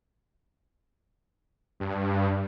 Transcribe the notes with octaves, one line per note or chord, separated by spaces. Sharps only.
G2